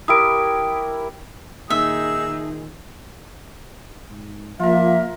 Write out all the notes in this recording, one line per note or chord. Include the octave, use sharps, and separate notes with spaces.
E4 G4 A#4 D#6 D7
A#2 D#3 D#4 G#4 E5 E6
G#2
F3 A#3 F4 A#4 E5